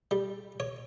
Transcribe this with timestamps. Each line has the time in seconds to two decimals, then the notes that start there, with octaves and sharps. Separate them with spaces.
0.11 G3
0.60 C#5